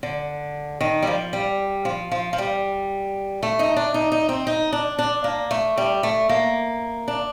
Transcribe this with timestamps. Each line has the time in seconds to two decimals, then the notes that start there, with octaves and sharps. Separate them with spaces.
0.03 D3
0.81 D#3
1.02 G3
1.07 F3
1.33 G3
1.85 F3
2.11 F3
2.33 F3
2.38 G3
3.43 A3
3.59 D#4
3.76 D4
3.94 D#4
4.12 D#4
4.29 C4
4.47 D#4
4.73 D4
4.99 D4
5.24 A#3
5.51 A3
5.77 G3
6.03 A3
6.29 A#3
7.08 D4